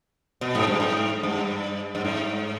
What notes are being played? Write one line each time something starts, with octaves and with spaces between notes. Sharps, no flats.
B2
G#2
G2
G#2
G2
G2
G#2